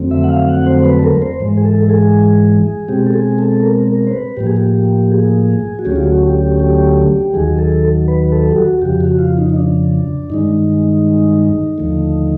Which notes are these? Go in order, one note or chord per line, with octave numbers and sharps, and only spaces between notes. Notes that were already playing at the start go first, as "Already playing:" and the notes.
Already playing: F2 D3 F#3 A3 C4
E5
F#5
F5
F#5
C5
B4
A4
A#4
C5
G#2 E3 G#3
G#4
A4
A4
G#4
B2 G#3 C4 G4
A4
G#4
A4
A#4
A#4
C5
B4
A2 F3 A#3 G4
G#4
G4
G#4
F#4
D2 D3 F#3 A3 C#4 G4
F4
F#4
G4
G4
G4
D#2 D#3 F#3 G#4
A4
B4
A4
G4
F#4
F2 C#3 F3 G4
F#4
F4
D#4
D#4
D4
G2 D#3 G#3 D#4
D#2 D3 F3 A3